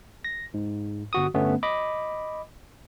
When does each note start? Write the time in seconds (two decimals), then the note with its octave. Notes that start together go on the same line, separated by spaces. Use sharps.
0.24 A#6
0.54 G#2
1.13 G1 F#4 D#6
1.34 G1 A3 B3 C#4
1.63 D#5 B5 D6